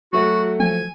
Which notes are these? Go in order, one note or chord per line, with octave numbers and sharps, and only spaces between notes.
F#3 A3 F#4
F3 G#5